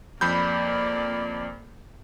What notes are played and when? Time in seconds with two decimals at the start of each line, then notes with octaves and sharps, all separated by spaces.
0.21 F2 A#3 D5 B5 G6